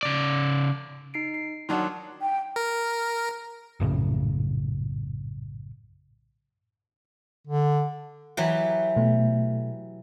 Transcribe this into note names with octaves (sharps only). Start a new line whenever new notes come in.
C#3 D5
D#4 C7 D7
C7
D#3 F#3 D4 F#5 A5 C6
G5
A#4
A#1 F#2 A2 C#3
D3
E3 F#3 G4
B2 A3